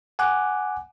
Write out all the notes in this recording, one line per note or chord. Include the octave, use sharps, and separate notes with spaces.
F#5 G#5 D6 F#6